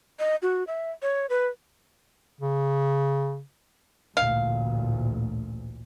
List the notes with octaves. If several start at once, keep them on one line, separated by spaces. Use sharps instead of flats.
D#5
F#4
E5
C#5
B4
C#3
A1 D2 A#2 F5